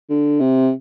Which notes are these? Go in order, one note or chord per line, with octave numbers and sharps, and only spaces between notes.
D3
C3